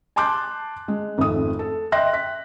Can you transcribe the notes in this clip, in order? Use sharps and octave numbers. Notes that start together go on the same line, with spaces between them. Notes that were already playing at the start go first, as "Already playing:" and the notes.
G#5 A5 C6 D6 F#6 G6
G#3
G#1 F2 A3 D#6
A4
D#5 E5 G5 C6 F#6 A#6
B6